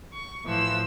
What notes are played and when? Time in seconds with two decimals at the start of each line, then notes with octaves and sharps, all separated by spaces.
0.13 C#6
0.45 A2 E3 F3 E6